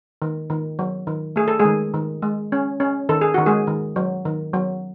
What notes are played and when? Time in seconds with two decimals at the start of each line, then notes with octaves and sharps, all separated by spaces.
0.22 D#3
0.50 D#3
0.79 F#3
1.07 D#3
1.36 A3 G#4
1.48 A4
1.59 G#3 G#4
1.65 D#3
1.94 D#3
2.22 G#3
2.52 C#4
2.80 C#4
3.09 D#3 A4
3.21 G#4
3.34 D#3 F#4
3.46 G#3 G#4
3.67 D#3
3.96 F#3
4.25 D#3
4.54 F#3